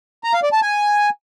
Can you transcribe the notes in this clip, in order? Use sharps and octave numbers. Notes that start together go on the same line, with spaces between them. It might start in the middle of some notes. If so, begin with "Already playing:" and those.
A#5
F5
D5
A5
G#5